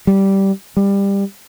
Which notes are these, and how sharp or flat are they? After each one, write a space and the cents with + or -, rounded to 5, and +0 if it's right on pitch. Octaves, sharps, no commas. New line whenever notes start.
G3 -10
G3 +20